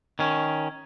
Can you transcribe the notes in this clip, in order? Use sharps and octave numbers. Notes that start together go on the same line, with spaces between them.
D#3 C#4